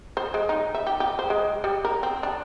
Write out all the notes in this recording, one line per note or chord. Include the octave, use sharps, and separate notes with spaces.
C5
G#3
D#4
E5
G4
G4
C5
G#3
G3
A#4
C4
D4